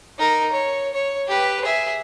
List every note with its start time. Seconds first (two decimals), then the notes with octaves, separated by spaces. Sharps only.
0.19 D#4 A#4
0.52 C#5
0.94 C#5
1.28 G4 B4
1.64 G#4 E5